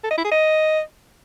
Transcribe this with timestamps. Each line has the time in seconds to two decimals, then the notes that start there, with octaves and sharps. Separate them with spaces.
0.04 A4
0.11 D#5
0.18 E4
0.25 G#4
0.32 D#5